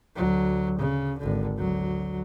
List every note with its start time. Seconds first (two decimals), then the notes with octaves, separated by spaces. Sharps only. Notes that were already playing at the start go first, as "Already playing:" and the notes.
0.16 D2 F#3
0.79 C#3
1.19 G#1 D3
1.58 D2 F#3